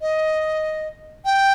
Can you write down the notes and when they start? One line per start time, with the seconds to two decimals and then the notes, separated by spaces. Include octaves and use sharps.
0.01 D#5
1.25 G5